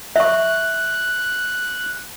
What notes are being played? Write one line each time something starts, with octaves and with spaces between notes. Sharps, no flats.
E5 C#6 F#6